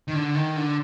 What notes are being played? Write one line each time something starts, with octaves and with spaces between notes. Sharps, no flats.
D#3
D3
D#3
D3